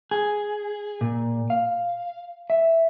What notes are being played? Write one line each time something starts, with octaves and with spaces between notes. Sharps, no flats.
G#4
A#2
F5
E5